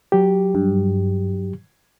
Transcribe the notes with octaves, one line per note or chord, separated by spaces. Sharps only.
F#3 G4
G2